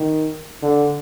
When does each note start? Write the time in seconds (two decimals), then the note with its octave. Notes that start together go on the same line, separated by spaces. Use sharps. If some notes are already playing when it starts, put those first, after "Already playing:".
Already playing: D#3
0.63 D3